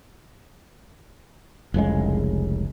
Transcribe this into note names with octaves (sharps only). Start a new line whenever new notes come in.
F1 C2 C#3 G#3